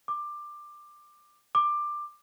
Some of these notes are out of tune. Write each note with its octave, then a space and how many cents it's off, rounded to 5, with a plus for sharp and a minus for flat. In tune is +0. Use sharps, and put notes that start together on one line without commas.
D6 +15
D6 +15